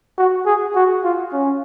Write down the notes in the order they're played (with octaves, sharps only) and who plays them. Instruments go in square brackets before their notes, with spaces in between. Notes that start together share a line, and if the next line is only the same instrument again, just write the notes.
[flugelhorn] F#4
G#4
F#4
F4
C#4